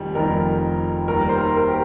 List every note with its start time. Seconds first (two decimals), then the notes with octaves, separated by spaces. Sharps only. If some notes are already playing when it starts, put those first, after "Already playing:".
Already playing: F1 F2 D#3 G3 G4
0.15 F1 F2 D#3 G3 A#4
1.07 D#2 D#3 G3 A#4
1.29 C5
1.38 A#4
1.57 A#4
1.68 G4